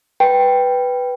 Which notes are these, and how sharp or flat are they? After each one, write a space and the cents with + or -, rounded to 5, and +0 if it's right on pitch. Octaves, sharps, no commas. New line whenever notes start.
B4 +0 G5 +0